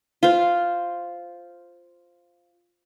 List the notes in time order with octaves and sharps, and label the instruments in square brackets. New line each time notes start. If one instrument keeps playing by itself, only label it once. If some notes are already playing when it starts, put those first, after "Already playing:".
[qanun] F4 C5